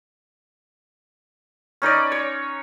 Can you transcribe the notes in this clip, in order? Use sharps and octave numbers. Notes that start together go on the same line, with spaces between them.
C#4 D#4 B4 D5
C#5